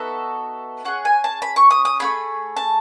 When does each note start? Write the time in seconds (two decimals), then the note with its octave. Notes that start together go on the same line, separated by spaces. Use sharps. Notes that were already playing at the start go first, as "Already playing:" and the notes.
Already playing: B3 D#4 F#4 A4 E5
0.85 C#4 G#4 F#5
1.05 G#5
1.24 A5
1.42 B5
1.56 C#6
1.71 D#6
1.85 D#6
2.00 A3 D#4 G#4 B5
2.57 A5